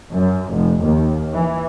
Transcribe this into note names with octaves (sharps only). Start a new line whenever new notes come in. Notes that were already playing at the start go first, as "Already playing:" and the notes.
F#2
F1
D#2
E3